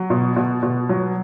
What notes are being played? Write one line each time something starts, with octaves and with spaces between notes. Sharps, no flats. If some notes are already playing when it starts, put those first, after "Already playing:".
Already playing: F#3
B2
B2
B2
F#3